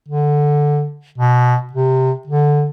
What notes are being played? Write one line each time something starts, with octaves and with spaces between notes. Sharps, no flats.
D3
B2
C3
D3